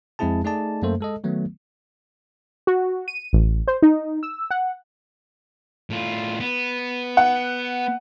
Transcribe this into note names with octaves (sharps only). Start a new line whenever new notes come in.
F2 G#3 C4 E4 G#4 A5
A3 D#4 G#4 D5 D#5 A5
F#2 A3 A#3 A4 C5
G#3 A4 D#5
D#3 F#3 A3 B3
F#4
D#7
A1
C5
D#4
E6
F#5
A2 F4
B3
F#5